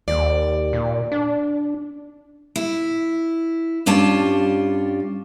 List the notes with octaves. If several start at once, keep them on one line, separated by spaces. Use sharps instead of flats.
D#2 D5
A#2
D4
E4
G2 G3 C#4 F4 A5